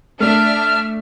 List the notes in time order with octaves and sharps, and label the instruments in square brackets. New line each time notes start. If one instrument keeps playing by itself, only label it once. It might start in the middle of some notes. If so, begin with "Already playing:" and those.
[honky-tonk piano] A3 [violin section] D4 E5 [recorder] F6